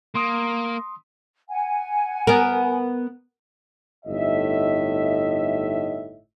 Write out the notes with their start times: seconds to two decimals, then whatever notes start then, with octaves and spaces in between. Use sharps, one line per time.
0.15 A#3 C6 D#6
1.50 F#5 G#5
2.27 B3 A#4
4.06 G1 A2 D#4 D#5 E5